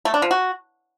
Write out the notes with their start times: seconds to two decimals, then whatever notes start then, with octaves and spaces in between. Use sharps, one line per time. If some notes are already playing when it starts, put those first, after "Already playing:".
0.05 A3
0.14 D4
0.22 F3
0.31 F#4